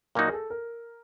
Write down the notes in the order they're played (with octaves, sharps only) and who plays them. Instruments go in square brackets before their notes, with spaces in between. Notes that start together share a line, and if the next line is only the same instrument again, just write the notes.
[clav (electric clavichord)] A#2 F#3 A#3 D#4 F#4 [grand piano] A#4
[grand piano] G#4
A4
A#4